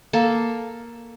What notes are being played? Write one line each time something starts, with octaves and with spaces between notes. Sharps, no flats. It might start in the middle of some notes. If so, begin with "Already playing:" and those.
A#3 A4